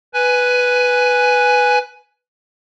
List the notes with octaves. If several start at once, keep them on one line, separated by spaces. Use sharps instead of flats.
B4 G#5